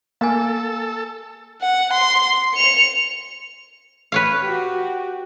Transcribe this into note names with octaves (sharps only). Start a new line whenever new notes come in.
A#3 A4 F5 G#5
F#5
C6
C#7 F7
B4 C#5 F5
F#4 G4